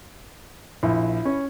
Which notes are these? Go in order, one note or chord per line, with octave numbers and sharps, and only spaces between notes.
A#1 E4
C#4